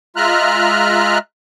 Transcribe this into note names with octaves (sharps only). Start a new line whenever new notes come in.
G#3 F4 E5 A#5 F6 F#6